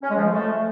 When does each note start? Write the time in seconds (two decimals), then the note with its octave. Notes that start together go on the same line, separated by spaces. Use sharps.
0.02 C#4
0.10 G#3
0.18 F3
0.25 G#3
0.33 A3